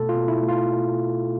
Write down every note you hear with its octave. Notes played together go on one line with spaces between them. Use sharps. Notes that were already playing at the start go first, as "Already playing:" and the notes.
Already playing: B2 A3 A4
F4
B2
E4
A3
F4